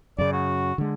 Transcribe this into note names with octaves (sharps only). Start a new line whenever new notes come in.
F#2 C#3 D5
F#4
D3 G#3